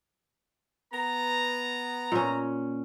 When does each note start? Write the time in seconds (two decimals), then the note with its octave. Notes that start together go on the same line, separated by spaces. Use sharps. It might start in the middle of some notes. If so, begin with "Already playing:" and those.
0.93 B3 A#5
2.12 A#2 C#4